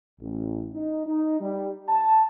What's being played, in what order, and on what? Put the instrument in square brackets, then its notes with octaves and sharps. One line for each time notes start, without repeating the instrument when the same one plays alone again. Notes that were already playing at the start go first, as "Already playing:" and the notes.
[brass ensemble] A1
D#4
D#4
G3
A5